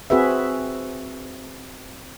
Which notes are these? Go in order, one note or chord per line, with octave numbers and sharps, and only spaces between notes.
C4 F#4 G#4 B4 E5